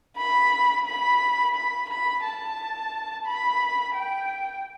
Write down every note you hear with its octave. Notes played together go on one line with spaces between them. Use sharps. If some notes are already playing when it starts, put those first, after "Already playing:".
B5
B5
B5
B5
A5
B5
G5